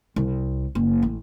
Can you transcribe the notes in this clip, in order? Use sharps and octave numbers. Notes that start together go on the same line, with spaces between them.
C2
F#1
A1